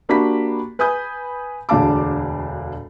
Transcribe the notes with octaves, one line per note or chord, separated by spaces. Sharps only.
A#3 D4 F#4 G4 B5 B6
B4 G#5 B5 D#6 G6
E1 D2 D4 F5 A5 D6